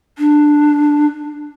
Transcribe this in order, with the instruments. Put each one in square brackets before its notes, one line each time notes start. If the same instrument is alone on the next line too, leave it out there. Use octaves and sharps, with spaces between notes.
[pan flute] D4